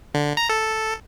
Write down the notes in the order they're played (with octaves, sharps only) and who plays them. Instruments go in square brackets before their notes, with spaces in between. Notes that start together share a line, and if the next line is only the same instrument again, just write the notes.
[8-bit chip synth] D3
A#5
A4